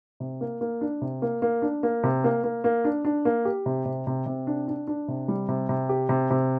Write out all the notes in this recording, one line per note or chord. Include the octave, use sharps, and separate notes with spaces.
C3
A#3
A#3
D4
C3
A#3
A#3
D4
A#3
C3
A#3
A#3
A#3
D4
D4
A#3
G4
C3
C3
C3
C3
D4
D4
D4
C3
G3
C3
C3
G4
C3
C3